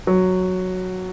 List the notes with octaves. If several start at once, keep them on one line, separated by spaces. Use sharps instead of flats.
F#3